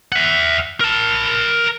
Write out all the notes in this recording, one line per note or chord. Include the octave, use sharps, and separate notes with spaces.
E5 F#5
A#4 A5